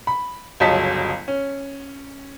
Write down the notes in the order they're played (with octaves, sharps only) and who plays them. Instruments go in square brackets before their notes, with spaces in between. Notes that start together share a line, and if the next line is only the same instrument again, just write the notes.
[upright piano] B5
G1 C#2 F#3 D#5 A5 B6
C#4